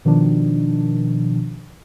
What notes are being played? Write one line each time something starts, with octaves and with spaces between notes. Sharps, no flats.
B2 D#3 F3 D4